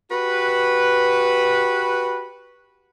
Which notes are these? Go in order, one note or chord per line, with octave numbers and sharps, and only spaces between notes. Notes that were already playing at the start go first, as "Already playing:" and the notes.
F#4 G4 B4